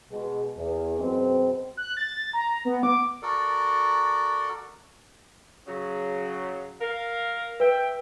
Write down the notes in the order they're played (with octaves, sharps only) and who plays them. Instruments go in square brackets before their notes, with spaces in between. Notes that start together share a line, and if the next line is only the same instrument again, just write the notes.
[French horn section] B2 G#3
E2
F#2 B2 G#3 C4
[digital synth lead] F#6
A6
A#5
B3
D6
[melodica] F#4 A4 A#4 D5
[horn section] C#3 F#3
A#4 F5
[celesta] B4 [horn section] E5 G5